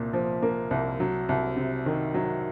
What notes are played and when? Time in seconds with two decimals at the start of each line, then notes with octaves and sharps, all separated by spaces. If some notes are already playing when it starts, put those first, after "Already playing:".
Already playing: C2 A#2
0.13 F3
0.42 A#3
0.71 C2
1.00 F#3
1.29 C2
1.56 C3
1.86 D#3
2.14 F#3